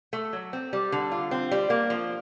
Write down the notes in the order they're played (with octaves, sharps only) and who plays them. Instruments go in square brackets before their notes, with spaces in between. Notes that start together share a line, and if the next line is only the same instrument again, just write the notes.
[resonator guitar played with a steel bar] A3
F#3
C4
G3
D3
F4
C4
G3
A#3
F3